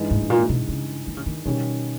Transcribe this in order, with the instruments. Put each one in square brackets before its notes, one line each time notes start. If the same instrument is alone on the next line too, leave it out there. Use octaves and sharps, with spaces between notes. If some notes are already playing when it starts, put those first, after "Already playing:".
Already playing: [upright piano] G2 E3 G#3 D#4
[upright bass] G#2
G#2
A#2
B2
C#3
D#3
C#3
D#3
[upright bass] B2 [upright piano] D#3 G3 C#4 G4